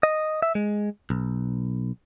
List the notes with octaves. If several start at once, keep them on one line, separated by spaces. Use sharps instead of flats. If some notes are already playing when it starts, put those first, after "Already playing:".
D#5
E5
G#3
B1